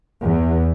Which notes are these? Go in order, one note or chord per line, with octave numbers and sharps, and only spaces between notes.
E2